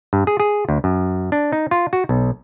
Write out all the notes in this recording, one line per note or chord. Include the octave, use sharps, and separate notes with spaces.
G2
G#4
G#4
D2
F#2
D4
D#4
F4
F#4
B1